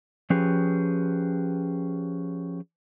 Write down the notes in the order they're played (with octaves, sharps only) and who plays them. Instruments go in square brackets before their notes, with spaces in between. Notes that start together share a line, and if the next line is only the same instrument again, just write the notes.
[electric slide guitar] F3 C#4 G4 G#4 B4